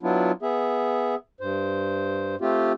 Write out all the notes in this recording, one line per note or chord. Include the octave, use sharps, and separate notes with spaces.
F#3 B3 D4 E4 F4
B3 G#4 E5
G2 C5
A3 C4 F4 G4